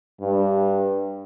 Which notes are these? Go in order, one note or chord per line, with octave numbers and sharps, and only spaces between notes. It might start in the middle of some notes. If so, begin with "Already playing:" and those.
G2